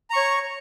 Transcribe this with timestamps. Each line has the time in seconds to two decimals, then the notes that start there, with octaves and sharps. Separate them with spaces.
0.10 A#5
0.13 C#6
0.16 C#5